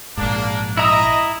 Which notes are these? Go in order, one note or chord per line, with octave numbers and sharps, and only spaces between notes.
A#1 G#2 A#3 D4
E4 D#5 E5 A#5 D#6